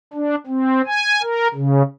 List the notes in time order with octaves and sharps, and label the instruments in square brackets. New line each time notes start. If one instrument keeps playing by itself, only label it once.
[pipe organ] D4
C4
G#5
A#4
C#3